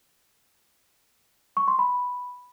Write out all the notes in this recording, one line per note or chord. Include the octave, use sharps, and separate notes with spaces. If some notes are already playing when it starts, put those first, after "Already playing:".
C#6
C6
B5